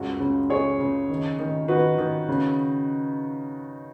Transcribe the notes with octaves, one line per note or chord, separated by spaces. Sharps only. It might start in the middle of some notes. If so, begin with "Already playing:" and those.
Already playing: C#2 F#2 F#4
C#3
C#3 G#4 C#5
C#3
D#3
D#3
D#3 F#4 B4
D#3
C#3